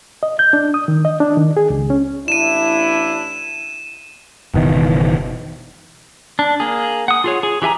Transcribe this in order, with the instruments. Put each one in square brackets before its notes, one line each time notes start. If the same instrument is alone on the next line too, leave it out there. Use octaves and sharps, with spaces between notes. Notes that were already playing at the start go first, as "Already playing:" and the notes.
[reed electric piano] D#5
G6
D4
D#6
D#3
D#5
D4
D#3
G#4
C#2
C#4
[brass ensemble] A1 D4 E4 [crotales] D#7 E7
[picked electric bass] F#1 B2 D#3 E3
[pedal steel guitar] D4
A#3 G#4
F#5 D#6
F4 G#4 C#5
G#4
E3 G4 E5 G#5 A#5